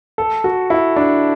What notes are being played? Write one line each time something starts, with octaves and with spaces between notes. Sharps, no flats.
A4
F#4
E4
D4